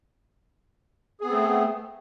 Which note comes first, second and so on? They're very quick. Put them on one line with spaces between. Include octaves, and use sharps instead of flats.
G#4 B3 C4 A3